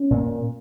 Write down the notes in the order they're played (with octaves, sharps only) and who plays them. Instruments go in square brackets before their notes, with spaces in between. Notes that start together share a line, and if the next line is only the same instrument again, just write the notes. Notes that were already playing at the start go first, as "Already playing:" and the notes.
Already playing: [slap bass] C#4
A#2